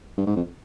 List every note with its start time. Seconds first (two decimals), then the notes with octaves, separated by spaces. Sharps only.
0.18 G2
0.27 G#2
0.36 F2